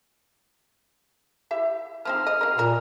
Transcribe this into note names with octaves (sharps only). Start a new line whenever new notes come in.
E4 G4 E5
F3 C4 D#4 F6
D#5
F#3 A#4
A#2 F#4 A#4